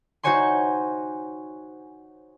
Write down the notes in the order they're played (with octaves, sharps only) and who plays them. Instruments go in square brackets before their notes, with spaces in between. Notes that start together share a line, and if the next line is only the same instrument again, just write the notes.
[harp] D#4 F#4 C5 C#5 G#5 C6